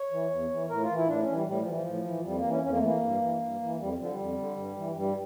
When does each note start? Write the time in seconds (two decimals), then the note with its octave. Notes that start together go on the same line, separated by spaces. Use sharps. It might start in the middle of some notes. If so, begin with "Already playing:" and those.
Already playing: C#5
0.12 E3
0.31 E2
0.50 E3
0.70 A2 A#4
0.83 F4
0.89 E3
0.96 E4
1.08 A2 D4
1.22 C#4
1.27 E3
1.34 G3
1.47 A2 G3
1.61 F3
1.67 E3
1.73 F3
1.86 A2
2.05 E3
2.24 F2 G3
2.38 A#3
2.44 E3
2.51 C#4
2.64 F2 C#4
2.71 A#3
2.78 A3
2.82 E3 A#3
3.02 G2
3.22 E3
3.41 G2
3.61 E3
3.79 F2 G3
4.00 D3 F3
4.09 G3
4.19 F2
4.38 D3
4.57 G2
4.77 E3
4.96 G2 G3